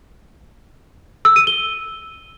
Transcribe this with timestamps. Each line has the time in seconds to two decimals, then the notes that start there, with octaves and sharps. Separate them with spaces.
1.25 E6
1.36 D#7
1.47 G7